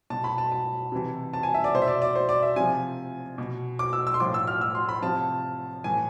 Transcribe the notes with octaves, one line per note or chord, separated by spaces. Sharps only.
B2 A5
B5
A5
A5
C3 E3
A5
G#5
E5
D5
B2 C5
E5
D5
D5
C5
D5
E5
C3 F3 G#5
B2
D6
E6
E6
C6
A2 F3 D6
E6
F6
E6
C6
B5
C3 F3 A5
A2 E3 G#5